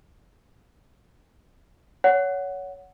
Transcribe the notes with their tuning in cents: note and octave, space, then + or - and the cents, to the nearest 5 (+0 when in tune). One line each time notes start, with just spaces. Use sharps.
C#5 +20 F#5 +0